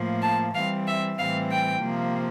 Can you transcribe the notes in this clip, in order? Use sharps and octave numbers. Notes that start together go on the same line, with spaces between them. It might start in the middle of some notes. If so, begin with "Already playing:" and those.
Already playing: A2 F3 A#3
A5
E3 G3 C4 F5
E5
A2 E3 G3 C4 F5
G5
C3 F3 A#3